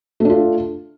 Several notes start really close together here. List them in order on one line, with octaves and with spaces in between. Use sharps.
A3 D4 F4